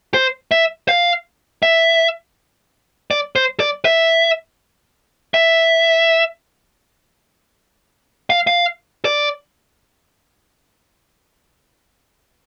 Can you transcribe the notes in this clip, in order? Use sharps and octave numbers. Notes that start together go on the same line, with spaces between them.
C5
E5
F5
E5
D5
C5
D5
E5
E5
F5
F5
D5